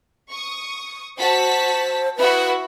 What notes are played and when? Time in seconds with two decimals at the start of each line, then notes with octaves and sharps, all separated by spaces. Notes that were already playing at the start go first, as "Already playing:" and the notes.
0.29 C#6 D#6
1.18 F#4 C5 A5 B6
2.17 E4 F#4 B4